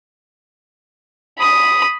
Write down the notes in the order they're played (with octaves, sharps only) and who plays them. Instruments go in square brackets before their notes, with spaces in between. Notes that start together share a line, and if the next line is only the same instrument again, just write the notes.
[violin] B5 D#6